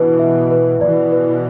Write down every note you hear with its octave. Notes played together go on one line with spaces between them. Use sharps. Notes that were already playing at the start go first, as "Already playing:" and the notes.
Already playing: B2 E3 D4 B4
E5
B4
B2 E3 D5
B4